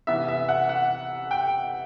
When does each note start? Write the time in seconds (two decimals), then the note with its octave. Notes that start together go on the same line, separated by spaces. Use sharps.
0.07 C3 E3 B3 E5
0.28 E5
0.49 F#5
0.69 F#5
1.31 G5